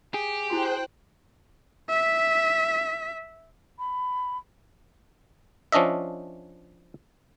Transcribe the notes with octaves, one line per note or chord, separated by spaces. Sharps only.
G4 G#4
E4 F#4 C5 G5 C6 F#6
E5 B6
B5
F3 C#4 D4 D#5 E5